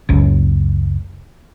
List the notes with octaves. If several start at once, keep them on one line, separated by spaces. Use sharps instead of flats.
F#1 C#2